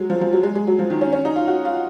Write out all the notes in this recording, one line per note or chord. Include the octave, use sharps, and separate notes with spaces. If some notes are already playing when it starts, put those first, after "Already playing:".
Already playing: F#3 G#3
F3
F3
F#3
G#3
G#3
F#3
F3
D#3
C#4
C#4
D#4
F4
F#4
F4